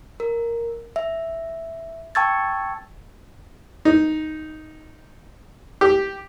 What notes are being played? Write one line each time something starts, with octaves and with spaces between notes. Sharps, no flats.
A#4
E5
G5 A5 C#6 E6 G#6 A6
D#4
G4